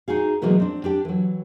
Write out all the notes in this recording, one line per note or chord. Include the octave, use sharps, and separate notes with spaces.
D#4 F#4 G#4 F5
B2 E3 F#3 G#3 A#3 B3
C4 D4
D4 G4 G5
E3 F#3